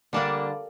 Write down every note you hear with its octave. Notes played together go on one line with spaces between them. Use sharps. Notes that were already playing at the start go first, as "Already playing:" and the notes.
D3 G3 A#3 D4 A5